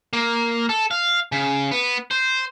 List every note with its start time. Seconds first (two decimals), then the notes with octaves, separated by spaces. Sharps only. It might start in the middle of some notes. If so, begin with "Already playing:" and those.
0.13 A#3
0.69 A4
0.91 F5
1.32 C#3
1.71 B3
2.11 C5